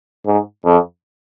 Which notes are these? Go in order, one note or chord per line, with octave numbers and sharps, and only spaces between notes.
G#2
F2